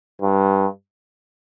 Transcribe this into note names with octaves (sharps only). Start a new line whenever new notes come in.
G2